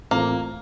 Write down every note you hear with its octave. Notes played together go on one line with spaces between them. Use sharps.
A2 E3 A3 A#3 C4 F4